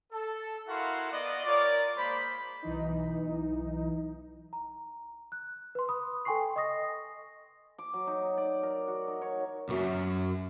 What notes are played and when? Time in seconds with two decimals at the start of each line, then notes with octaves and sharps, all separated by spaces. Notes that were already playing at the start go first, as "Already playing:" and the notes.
0.12 A4
0.68 E4 F#4 A#4 F5 F#5 C6
1.12 B3 D5 D#5
1.45 F4 A#4 C#5 D5
1.97 G#3 A#3 C5 D5 B5
2.62 B1 E3 D#4
4.53 A#5
5.32 F#6
5.75 B4 C6
5.89 B5 D#6
6.25 A4 G5 G#5 C6 C#6 C7
6.56 D#5 C#6 D#6 A#6
7.78 D6
7.93 F#3
8.07 D#4
8.38 D5
8.63 A#4
8.87 F#4
9.08 D#4
9.21 C#5
9.69 B1 F#2